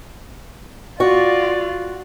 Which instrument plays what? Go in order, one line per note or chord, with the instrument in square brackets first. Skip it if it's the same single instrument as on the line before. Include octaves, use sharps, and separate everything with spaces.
[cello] F4 [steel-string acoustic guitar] F#4 [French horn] D5